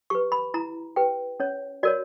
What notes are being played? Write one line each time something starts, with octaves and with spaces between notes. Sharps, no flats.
G4 B4 C#6
B5
E4 A#5
G4 B4 G5
C#4 C#5
F#4 A#4 C#5 D5